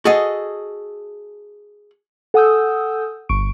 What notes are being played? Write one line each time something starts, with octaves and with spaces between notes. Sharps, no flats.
F#4 G#4 A4 D#5
A4 F#5 G#5 D#6 E6 G6
G1 C#6 D7